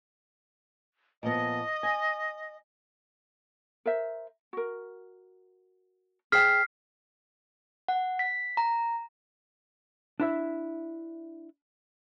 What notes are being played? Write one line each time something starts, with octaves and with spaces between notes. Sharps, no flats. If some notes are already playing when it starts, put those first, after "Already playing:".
A#2 F3 B3 D#5
G#5
A#4 C5 E5
F#4 A#4
G#4 C5 G5 F6 B6 C7
F#5
B6
A#5
D4 E4 E5